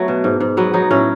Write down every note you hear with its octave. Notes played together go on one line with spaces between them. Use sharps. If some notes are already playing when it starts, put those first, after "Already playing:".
Already playing: F#3 A3 B3
B2
G#2
G#2
F#3 B3
F#3 D#4
A2 C#4